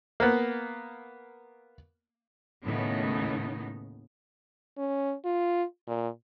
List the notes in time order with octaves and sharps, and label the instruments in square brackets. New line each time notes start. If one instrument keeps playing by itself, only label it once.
[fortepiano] A#3 B3
[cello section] D#2 A2 C#3 B3 D#4
[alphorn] C#4
F4
A#2